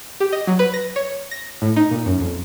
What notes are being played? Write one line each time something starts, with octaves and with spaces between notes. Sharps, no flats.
G4
D#5
F#3
B4
A#6
C#5
A#6
A2
D#4
A#2
F#2
F2